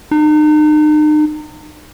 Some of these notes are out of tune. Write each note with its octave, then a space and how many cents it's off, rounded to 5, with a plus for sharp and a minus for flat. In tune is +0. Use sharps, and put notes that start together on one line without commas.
D#4 -40